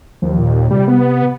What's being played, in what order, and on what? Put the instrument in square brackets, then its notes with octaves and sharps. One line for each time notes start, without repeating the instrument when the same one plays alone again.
[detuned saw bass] D#2 [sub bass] F3
[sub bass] A#2
[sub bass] C3 [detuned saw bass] G3
[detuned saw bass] B3